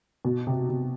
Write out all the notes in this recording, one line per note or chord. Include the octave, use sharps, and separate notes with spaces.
B2
C3
C3